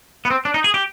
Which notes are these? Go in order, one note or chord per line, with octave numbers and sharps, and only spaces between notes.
B3
C4
D4
D#4
G#4
G4